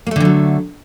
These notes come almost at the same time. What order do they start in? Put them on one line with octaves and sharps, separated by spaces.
A#3 A3 D3 E3 F#3